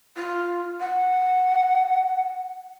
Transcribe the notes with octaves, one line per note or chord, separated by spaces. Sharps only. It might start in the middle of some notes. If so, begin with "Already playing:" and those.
F4
F#5